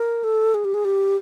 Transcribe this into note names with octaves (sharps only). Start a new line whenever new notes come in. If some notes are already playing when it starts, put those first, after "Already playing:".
Already playing: A#4
A4
G#4
G4
G#4
G4